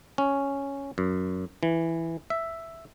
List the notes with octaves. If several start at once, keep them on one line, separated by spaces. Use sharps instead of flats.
C#4
F#2
E3
E5